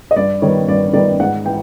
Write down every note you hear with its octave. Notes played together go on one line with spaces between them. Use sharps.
D#5
G2 D5
D#3 G3 B3 C#5
G2 D5
D#3 G3 B3 D5
G#2 F#5
E3 G5